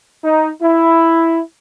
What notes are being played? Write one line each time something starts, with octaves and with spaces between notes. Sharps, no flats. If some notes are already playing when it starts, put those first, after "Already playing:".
D#4
E4